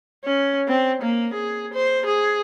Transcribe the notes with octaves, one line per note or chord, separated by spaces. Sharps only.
C#4
C4
A#3
G#4
C5
G#4